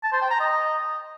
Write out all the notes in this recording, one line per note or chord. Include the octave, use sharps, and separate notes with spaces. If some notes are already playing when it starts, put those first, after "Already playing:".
A5
C5
G5
A#5
D#5